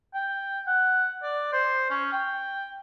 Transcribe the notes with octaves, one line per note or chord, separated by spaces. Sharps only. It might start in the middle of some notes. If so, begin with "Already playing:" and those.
G5
F#5
D5
C5
C#4
G5